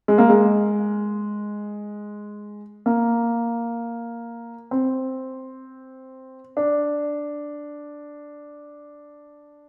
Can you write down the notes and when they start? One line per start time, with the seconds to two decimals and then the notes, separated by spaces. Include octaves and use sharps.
0.08 G#3
0.18 A#3
0.29 G#3
2.86 A#3
4.71 C4
6.57 D4